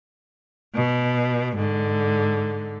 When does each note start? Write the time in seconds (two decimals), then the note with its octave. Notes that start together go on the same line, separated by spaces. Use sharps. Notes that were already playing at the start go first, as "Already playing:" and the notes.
0.74 B2
1.54 G#2 D3